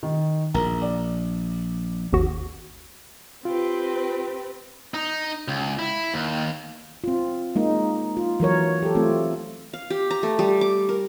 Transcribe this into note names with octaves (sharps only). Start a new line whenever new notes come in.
D#3
A#1 A#4 A#5
D5
G#1 D#2 F#4
C4 F4 G4 B4
D#4
C#2
E4
D#2
C4 F4
G#3 A#3 D#4
F4
E3 F#3 A#4 C#5
G4 A4
A3 C4 F4
F5
G4
A#5
A3
G3
D6
A#4